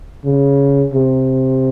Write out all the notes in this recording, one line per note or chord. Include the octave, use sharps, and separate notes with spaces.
C#3
C3